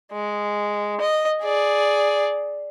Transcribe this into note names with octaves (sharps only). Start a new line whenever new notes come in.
G#3
D#5
G#4 D5